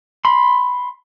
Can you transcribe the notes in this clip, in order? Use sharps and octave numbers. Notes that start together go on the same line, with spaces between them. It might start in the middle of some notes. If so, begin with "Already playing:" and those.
B5 C6